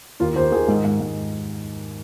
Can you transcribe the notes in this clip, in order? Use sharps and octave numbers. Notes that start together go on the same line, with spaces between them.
D#2 F4
D#2 C5
D#3 G#4
G#2
G#2
G#2